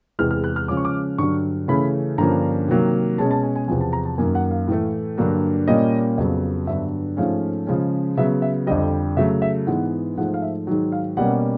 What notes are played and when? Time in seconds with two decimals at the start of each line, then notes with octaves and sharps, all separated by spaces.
0.19 E2 C3 E3 G#3 F6
0.31 F6
0.44 F#6
0.56 F6
0.68 C#3 F3 G#3 C#4 D6
0.77 C#6
0.85 D6
1.18 G2 D3 F#3 C#6
1.68 C#3 E3 A3 C#4 B5
2.18 G2 D3 F3 A#3 C#4 A#5
2.68 C3 D#3 F#3 A#3
3.18 B2 G#3 C#4 A5
3.31 A5
3.43 G#5
3.56 G#5
3.68 E2 C3 F3 G#5
3.81 A5
3.93 A#5
4.05 A5
4.18 F#2 D#3 F#3 A#3 G#5
4.35 F#5
4.51 F5
4.68 A2 E3 A3
5.18 G2 D3 F#3 A#3
5.68 A#2 G3 A#3 C#4 D#5
6.18 F2 C#3 F#3 B3
6.67 G2 D3 F#3 B3 E5
7.17 G#2 F3 A3 C#4 F5
7.67 C#3 F3 G#3 C#4
8.17 C#3 F#3 B3 E5
8.42 E5
8.67 F2 D3 G3 D#5
9.17 C#3 F#3 A3 E5
9.42 E5
9.67 G#2 E3 G#3 B3 F#5
10.17 G#2 F3 A3 F#5
10.34 F5
10.42 E5
10.67 G#2 D#3 F#3
10.92 F5
11.17 B2 G3 A#3 C#4 F#5